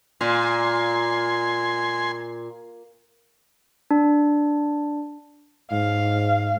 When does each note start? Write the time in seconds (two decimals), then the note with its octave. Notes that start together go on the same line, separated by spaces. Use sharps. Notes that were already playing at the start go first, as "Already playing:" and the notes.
0.21 A#2 G#5 C6
3.91 D4
5.72 G#2 F5